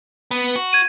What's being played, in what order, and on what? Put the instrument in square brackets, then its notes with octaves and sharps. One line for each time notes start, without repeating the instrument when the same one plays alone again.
[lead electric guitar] B3
F#4
[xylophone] G#6 D#7